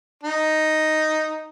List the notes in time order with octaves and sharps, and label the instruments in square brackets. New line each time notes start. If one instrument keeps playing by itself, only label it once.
[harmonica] D#4